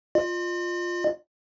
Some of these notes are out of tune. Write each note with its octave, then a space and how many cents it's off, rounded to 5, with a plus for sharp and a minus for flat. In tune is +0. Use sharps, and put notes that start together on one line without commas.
F4 +5 D#5 -45